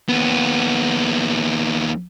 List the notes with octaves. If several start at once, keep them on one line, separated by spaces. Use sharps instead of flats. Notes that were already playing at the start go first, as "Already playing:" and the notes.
D#2 B3